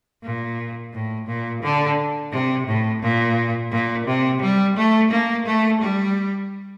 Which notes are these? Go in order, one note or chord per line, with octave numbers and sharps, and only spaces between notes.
A#2
A2
A#2
D3
C3
A2
A#2
A#2
C3
G3
A3
A#3
A3
G3